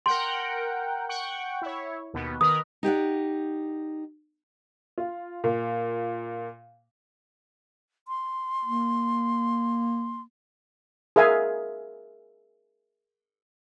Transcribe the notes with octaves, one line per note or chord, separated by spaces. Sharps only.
A#4 F#5 G5 C6
F#5 G5 C#6
E4 C#5
D#2 B2 B3
D#3 A#4 B4 D#6
D#4 G4 D5 F#5
F4
A#2
C6
A#3
G#4 A#4 E5 F5 G#5